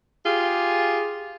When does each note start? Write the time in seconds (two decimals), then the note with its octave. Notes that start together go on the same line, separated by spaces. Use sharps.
0.25 F4 G4 G#4